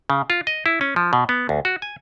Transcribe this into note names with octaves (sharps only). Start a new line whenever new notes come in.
C#3
F4
D#5
E4
C#4
F3
B2
B3
D2
F#4
G#5